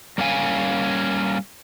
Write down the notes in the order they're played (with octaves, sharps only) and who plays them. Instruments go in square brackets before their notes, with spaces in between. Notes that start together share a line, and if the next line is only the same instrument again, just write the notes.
[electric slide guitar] G3 A#3 C#4 F5 G#5